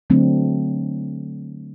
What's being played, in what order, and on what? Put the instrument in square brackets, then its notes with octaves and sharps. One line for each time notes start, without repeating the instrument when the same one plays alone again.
[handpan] D3 F#3 A3 C4 D4